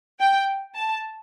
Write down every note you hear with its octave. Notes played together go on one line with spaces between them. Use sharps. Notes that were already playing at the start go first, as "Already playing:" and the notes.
G5
A5